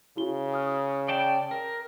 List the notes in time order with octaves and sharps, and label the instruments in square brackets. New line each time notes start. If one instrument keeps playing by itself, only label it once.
[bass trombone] C#3 [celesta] E4 F#4 G7
[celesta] D#6 F6
[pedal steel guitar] D5 G5 A5
A#4